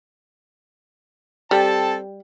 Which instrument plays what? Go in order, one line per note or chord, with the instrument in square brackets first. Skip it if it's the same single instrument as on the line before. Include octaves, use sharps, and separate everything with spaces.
[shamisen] G3 [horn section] C4 A4 A5